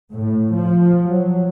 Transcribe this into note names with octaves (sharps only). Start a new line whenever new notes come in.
A2
F3
F#3